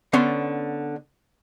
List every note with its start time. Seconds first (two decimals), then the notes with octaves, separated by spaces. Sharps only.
0.13 D3 B3 C#4 C#5 C6